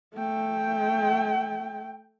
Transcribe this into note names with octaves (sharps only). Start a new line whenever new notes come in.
A3 G5